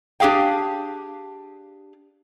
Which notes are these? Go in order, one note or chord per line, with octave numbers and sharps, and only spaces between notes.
D4 G4 G#4 F5 G5